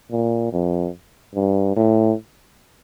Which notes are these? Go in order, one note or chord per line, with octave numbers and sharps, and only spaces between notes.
A#2
F2
G2
A2